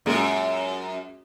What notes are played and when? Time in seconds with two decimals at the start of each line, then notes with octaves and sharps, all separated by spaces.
0.06 F#2 A#2 G#3